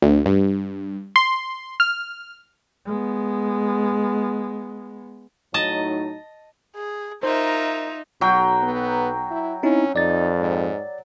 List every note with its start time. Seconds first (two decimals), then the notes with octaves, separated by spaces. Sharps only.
0.02 D2
0.26 G2
1.16 C6
1.80 F6
2.86 G#3 B3
5.54 A2 F#3 D#4 D#5 A5
6.75 G#4
7.23 D#4 F4 A#4 C5 E5
8.21 B1 F#3 G5
8.63 B3
9.31 E4
9.63 C4 C#4 D#4 E4
9.96 F2 D#4 D5 A6
10.40 G#2